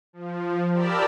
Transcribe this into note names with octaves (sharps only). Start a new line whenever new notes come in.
F3
G4 A#4 D5 A5 B5 E6